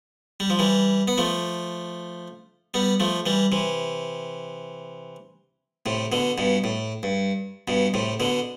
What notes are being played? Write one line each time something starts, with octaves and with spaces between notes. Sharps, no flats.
G3
F3
E3 G3
B3
F3 A3
G3 B3
F3 A3
E3 G3
C3 E3
A2 C3
B2 D3
G2 B2
A2
G2
G2 B2
A2 C3
B2 D3